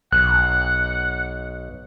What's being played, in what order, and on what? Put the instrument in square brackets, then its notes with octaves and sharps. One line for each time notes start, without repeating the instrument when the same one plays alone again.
[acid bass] B1 [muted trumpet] F#5 [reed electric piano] F#6